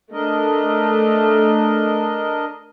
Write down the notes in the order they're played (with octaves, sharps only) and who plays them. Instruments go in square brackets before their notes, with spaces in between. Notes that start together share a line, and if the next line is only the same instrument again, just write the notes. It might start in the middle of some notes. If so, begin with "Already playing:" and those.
[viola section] A3 [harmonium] D4 A#4 D#5